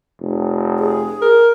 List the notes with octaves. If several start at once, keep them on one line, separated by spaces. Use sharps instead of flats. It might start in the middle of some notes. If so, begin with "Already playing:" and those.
F1
G#4
A#4